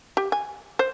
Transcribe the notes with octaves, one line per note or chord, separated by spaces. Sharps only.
G4
G#5
C5